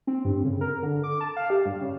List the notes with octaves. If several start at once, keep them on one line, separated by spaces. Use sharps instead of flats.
C4
G2
C#3
A#4
D3
D6
A5
F5
G4
G2
C#3